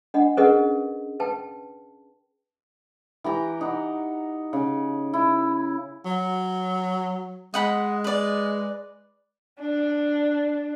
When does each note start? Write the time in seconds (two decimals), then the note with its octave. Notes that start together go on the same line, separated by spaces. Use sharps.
0.14 D4 D#5 F#5
0.37 C#4 G#4 A#4 B4 D#5 F#5
1.20 B4 G5 A5
3.24 E3 G4 A#5
3.61 D#4 F#5
4.53 C#3
5.13 E4
6.05 F#3
7.54 G#3 D#5 F#5 B5
8.04 B4 D5
9.60 D4